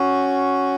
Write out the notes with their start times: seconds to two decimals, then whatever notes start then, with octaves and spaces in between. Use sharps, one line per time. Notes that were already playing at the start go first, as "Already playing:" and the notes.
Already playing: C#4 F#4